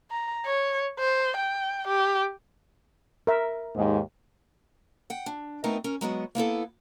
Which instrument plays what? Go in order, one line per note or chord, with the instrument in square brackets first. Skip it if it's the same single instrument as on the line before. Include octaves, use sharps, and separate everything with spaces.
[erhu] A#5
C#5
C5
G5
G4
[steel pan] A#4 E5
[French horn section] D#2 G#2
[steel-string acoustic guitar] F#5 G5
D4
A3 B3 C4 D#4 E4 A#4
C#4 A#4
F#3 G#3 B3 F#4
A#3 B3 E4 A4